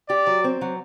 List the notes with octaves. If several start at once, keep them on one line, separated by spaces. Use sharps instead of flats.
G4 D5
F#3
C4
F#3